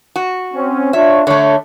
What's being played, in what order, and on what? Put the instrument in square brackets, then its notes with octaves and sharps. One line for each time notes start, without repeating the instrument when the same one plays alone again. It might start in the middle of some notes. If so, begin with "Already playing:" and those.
[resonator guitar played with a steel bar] F#4
[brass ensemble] C4 C#4
[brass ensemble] D4 F4 C#5 [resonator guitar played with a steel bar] E5
[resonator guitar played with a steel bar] D3 A3 [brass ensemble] C#5